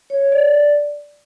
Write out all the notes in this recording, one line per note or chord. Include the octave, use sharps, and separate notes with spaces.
C#5
C#5
D5